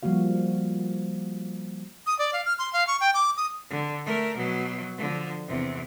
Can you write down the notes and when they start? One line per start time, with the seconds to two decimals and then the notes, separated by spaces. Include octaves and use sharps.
0.03 F3 G3 A#3 F#4 F5
2.07 D#6
2.19 D5
2.33 F5
2.45 F6
2.59 C6
2.73 F5
2.87 C#6
3.01 G5
3.14 D6
3.37 D#6
3.70 D3
4.06 A3 A#4
4.37 B2 F#3
4.98 D3 F3
5.48 E2 C3